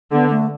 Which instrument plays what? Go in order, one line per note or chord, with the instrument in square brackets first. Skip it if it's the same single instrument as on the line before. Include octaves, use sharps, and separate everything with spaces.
[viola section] D3 [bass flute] B3
[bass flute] A3